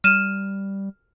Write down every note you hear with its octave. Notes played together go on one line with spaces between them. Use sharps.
G3 F6 D#7 E7